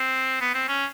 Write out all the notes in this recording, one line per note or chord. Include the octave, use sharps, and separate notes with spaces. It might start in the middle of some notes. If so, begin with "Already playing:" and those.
Already playing: C4
B3
C4
C#4